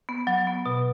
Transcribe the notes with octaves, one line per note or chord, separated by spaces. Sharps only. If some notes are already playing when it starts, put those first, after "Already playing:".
B3
F#3
B3
B2